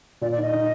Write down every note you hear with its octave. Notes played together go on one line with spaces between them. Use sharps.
A#2 D5
D5
D#4 D#5
D#4